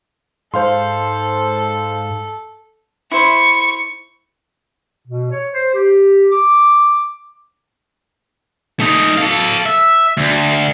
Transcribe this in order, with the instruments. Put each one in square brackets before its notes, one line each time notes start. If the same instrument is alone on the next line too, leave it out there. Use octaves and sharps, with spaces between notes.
[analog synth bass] G#2 [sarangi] A4 [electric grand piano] C5 F5 C6
[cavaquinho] E4 C5 [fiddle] C#6
[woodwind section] B2
C#5
C5
G4
D6
[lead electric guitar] A3 D#4
A4 F5
E5
D2